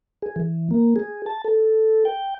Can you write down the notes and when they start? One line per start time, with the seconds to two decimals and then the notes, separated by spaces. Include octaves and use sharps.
0.22 G#4
0.36 E3
0.71 A#3
0.96 G#4
1.26 A5
1.44 A4
2.05 G5